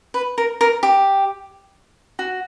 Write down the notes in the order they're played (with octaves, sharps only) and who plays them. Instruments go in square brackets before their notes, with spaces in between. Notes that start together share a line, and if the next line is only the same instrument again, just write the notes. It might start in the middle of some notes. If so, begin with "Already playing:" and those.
[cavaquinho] B4
A#4
A#4
G4
F#4